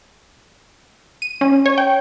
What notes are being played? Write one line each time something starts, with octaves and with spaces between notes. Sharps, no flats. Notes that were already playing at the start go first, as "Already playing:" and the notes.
D#7
C#4
C#5
G5